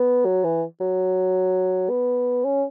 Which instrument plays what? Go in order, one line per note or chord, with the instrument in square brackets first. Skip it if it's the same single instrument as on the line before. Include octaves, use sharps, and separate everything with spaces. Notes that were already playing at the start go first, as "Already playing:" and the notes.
Already playing: [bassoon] B3
F#3
E3
F#3
B3
C#4